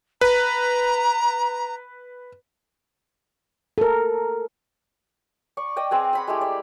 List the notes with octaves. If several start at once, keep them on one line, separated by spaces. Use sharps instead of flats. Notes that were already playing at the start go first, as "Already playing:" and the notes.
B4 A#5
A4 A#4
D5 C#6
D5 D#5 G5
C4 G#4 B4
F#5 B5 C6
G#3 A3 E4 G4
D5